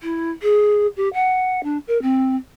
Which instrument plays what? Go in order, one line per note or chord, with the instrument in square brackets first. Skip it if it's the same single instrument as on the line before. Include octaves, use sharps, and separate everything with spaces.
[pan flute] E4
G#4
G4
F#5
D4
A#4
C4